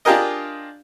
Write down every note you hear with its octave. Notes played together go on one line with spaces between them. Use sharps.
D4 F4 G4 G#4 A#4 D#5